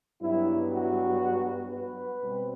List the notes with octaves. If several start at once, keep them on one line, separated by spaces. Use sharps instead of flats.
G2 F#3 B3 E4
F#4
B4
B2 G3 C4